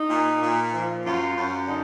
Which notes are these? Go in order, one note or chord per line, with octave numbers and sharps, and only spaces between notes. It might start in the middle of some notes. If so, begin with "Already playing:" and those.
Already playing: D#4
A#2
A#2
F3
F#2 F4
F#2
D3 D#4